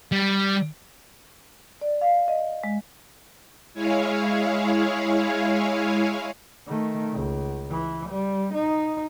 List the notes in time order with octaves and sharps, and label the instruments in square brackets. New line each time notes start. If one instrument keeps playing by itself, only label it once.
[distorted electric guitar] G3
[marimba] D5
F5
D#5
G#3
[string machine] G#3 E4 G#4 C#5 F5
[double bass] D#3 A3
C#2
E3
G3
D#4